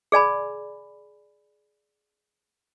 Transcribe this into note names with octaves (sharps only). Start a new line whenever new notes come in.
G#4 D5 G#5 B5